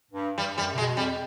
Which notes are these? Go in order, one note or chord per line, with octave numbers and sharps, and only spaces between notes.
G2
G2 G3
F#2 G3
C3
B2 G#3
F2 G3